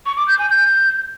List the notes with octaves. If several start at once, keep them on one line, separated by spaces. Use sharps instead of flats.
C#6
D6
G6
G#5
G6